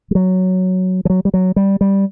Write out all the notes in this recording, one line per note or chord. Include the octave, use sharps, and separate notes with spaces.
G3
F#3
F3
F#3
G3
F#3
G3
G3